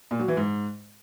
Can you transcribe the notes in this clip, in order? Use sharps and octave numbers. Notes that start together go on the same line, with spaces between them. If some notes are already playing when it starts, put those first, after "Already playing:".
A#2
F#3
E3
G#2